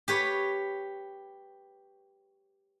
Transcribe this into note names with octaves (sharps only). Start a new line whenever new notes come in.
G4 B4 C#5